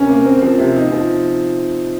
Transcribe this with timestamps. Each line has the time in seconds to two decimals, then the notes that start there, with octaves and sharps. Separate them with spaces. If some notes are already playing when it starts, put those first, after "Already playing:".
Already playing: C3 C#4 A#4
0.09 A#3
0.26 C4
0.42 F3
0.58 C3
0.76 D#4
0.92 F3